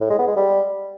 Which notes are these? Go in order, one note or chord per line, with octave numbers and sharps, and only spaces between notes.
A2
G#3
B3
G#3
G3